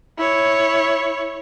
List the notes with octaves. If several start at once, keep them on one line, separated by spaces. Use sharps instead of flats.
E4 C#5